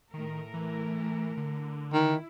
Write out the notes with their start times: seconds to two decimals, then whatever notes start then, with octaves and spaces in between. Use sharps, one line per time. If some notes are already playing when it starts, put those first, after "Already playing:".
0.14 A2 D#3 A3 A#4
0.54 E3
1.37 D3
1.93 D#3 E4